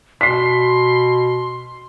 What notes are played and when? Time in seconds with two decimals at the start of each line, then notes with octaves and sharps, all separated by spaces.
0.21 B2 C6 B6 C7